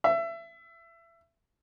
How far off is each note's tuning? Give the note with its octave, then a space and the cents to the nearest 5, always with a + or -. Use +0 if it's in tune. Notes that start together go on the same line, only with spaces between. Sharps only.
E5 +25